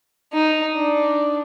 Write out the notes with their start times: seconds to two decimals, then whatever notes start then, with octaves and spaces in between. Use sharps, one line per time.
0.33 D#4
0.76 D4